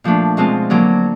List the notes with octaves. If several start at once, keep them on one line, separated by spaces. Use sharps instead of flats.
A#2 F3 A3 D4
B2 G#3 C4 F4
D3 F#3 A#3